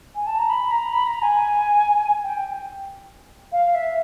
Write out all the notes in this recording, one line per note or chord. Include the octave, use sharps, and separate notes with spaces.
G#5
A5
A#5
B5
A#5
B5
A#5
G#5
G5
F5
E5